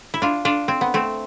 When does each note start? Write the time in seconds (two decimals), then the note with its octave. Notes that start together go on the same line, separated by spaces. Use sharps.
0.14 E4
0.22 D4 F4
0.45 D4 F4
0.68 C4
0.81 B3
0.94 A3 C4